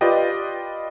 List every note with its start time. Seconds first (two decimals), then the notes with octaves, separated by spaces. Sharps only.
0.01 F4 G4 B4 D5 D#5 G5